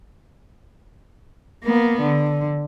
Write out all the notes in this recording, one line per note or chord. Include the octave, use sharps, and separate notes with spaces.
A#3 B3
D3